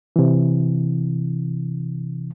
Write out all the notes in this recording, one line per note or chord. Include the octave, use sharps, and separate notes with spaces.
C3 E3